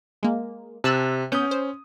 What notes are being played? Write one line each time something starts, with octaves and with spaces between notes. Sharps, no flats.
G#3 A#3
C3 A5 E6 F#6
B3 C#4 D#6 G6
C5